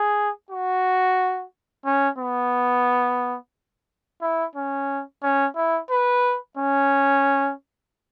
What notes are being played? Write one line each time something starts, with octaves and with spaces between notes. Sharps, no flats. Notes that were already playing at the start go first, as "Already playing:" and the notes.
Already playing: G#4
F#4
C#4
B3
E4
C#4
C#4
E4
B4
C#4